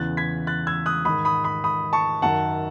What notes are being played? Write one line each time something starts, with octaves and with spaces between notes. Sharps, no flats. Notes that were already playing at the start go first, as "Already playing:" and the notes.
Already playing: E2 C#3 E3 F#6 A6
G#6 B6
F#6 A6
E6 G#6
D#6 F#6
G#2 D#3 B5 D#6
B5 D#6
B5 D#6
B5 D#6
A5 C#6
F#2 D#3 F#5 A5